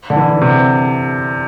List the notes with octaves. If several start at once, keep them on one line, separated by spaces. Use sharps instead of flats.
D3
E3
C3